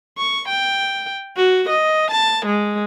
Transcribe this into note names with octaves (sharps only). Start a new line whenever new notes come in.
C#6
G5
F#4
D#5
A5
G#3